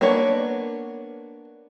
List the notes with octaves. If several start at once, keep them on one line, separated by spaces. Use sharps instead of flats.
A#3 B3 D4 A#4 C#5